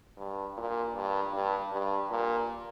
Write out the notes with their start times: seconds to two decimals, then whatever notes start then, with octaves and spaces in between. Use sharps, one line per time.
0.18 G2
0.57 A#2
0.95 G2
1.33 G2
1.72 G2
2.10 A#2